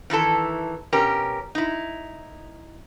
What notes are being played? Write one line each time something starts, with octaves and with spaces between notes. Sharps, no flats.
D#3 E3 E4 A4
B2 C#4 G4 A#4
D#4 E4